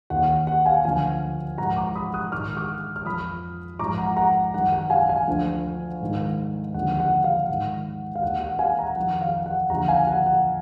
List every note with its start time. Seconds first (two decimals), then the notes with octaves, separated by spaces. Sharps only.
0.10 D#2 D#3 F#5
0.47 F#5
0.66 F5 G#5
0.85 D2 D3 F3 F5 G#5
1.58 G#2 F3 F#5 A#5
1.76 A#5 D6
1.95 B5 D#6
2.14 D#6 F#6
2.32 G#2 D#3 D6 F6
2.57 D6 F6
2.96 F6
3.05 F2 F3 B5 D#6
3.79 G#2 F3 A#5 D6
3.98 F#5 A#5
4.16 F#5 A#5
4.54 F#2 D#3 F#5
4.73 F#5
4.90 F5 G#5
5.09 F5 G#5
5.27 D2 D3 F3
6.01 G#2 D#3
6.74 D#2 D3 F3 F#5
7.00 F#5
7.24 F5
7.49 G#2 D#3 F#5
8.15 F5
8.23 D#2 D#3 F#5
8.41 F#5
8.59 F5 G#5
8.78 F#5 A#5
8.96 F2 D#3 F#5
9.22 F5
9.46 F#5
9.70 D#2 D3 F3 F#5 A#5
9.88 F5 G#5
10.07 F#5
10.26 F#5